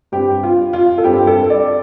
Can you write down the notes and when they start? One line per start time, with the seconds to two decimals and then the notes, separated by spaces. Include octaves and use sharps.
0.12 G2 G3 C4 G4
0.43 F4
0.73 F4
0.98 A4
1.04 G2 G3 C4 G4
1.27 A4
1.50 D5